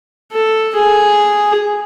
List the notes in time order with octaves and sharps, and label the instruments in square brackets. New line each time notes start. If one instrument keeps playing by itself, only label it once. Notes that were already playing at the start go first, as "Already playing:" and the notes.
[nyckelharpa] A4
G#4